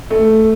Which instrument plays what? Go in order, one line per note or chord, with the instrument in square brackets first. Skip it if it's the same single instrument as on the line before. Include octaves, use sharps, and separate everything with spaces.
[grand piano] A3